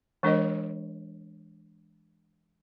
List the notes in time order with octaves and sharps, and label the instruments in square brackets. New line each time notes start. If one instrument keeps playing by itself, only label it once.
[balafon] E3 G#3 D4 A#4 C#5 D#5